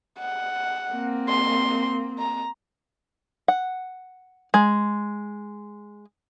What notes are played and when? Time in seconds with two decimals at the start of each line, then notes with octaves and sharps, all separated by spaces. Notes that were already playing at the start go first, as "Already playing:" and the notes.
0.19 F#5
0.93 A#3 C4
1.29 C6
2.19 A#5
3.48 F#5
4.54 G#3